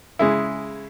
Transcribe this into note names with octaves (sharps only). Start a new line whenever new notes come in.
C#3 G#3 E4